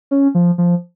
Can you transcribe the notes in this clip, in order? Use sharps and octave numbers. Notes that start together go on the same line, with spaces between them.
C#4
F3
F3